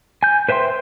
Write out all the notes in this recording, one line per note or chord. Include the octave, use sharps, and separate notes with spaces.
G#5 G6
B4 C5 E5 G5 C6